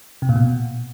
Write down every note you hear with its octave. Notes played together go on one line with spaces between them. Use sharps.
C3
A#2
B2